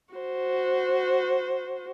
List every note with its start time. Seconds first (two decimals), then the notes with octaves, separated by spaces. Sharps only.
0.14 F#4 C5